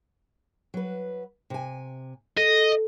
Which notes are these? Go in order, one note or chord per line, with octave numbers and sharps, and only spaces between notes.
F#3 B4
C3 G#5
A4 D#5